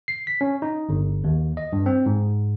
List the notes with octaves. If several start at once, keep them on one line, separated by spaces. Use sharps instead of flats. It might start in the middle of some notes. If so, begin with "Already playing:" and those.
C7
B6
C#4
D#4
G1
D#2
D#5
G2
C4
G#2